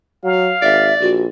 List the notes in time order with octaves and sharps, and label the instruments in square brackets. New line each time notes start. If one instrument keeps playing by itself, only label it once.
[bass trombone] F#3 [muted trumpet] F5
[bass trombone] G#1 [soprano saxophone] D5 [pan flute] E5
[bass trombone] A#1 [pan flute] F#4